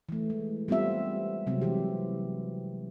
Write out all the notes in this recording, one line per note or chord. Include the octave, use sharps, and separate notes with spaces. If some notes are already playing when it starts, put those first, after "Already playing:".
E3 A3
G#3
G3 B3 C4 F4 E5
C3 F#3 G#3 C4
E3 G4